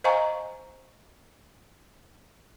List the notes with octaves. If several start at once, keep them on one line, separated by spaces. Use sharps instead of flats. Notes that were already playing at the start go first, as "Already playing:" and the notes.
C5 D#5 F5 G#5 A#5 C#6